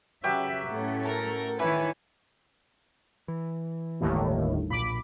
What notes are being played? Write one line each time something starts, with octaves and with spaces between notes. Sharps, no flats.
C#3 F#3 G4 B4 E5
A2 A3 C#4
A4 A#4
D#3 E3 E4 B4 C#5
E3
G1 D#2 A2
B1 A#2 B5 D6